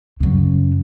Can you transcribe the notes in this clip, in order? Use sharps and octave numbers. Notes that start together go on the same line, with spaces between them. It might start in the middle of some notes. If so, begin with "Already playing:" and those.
F#2 C#3